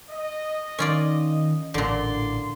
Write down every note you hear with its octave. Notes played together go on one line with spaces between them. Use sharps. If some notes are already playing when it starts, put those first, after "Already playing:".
D#5
D#3 C#4 F4 D5
A1 A#2 D3 D5 C6